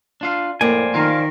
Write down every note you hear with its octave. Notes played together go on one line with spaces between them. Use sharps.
D4 F4 F5
F2 A2 A3 A#3 C5 D5 G#5
D#3 F4 A#4 F5